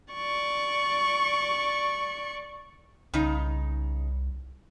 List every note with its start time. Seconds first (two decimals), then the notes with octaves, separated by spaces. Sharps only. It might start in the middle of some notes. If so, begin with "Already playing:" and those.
0.14 D5 C#6
3.14 C2 C#3 D#4